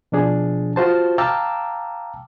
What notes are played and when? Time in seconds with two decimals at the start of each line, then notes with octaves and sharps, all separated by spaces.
0.12 B2 F3 D4 G#4
0.76 F4 F#4 C5 A5
1.18 F5 G5 A5 A#5 D6 E6